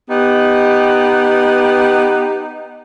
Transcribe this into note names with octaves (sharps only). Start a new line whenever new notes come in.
B3 D#4 G4